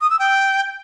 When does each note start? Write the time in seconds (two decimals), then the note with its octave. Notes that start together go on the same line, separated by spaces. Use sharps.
0.01 D#6
0.10 E6
0.19 G5